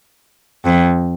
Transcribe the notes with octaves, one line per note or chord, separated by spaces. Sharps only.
F2